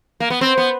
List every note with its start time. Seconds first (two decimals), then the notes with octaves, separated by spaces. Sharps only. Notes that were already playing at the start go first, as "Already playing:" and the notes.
0.20 A#3
0.30 B3
0.41 C4 C5
0.57 B3